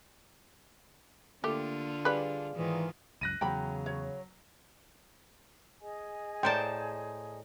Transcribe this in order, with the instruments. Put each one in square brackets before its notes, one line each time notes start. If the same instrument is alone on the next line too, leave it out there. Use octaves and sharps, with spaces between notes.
[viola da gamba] D3 D4 F4 [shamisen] A3 G4 [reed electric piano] A#3
[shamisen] G3 B4 [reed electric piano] G#4 D5 F5
[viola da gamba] G#2 D#3 F4 [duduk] E3
[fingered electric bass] C#2 F#2 [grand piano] F#6 A#6 D#7
[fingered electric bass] E2 [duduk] C#3 [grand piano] F#3 [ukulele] G5 B5
[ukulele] C#5
[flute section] G#4 D#5 G#5
[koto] A2 C5 A5 [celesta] D5 A#5 C6 [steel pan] G5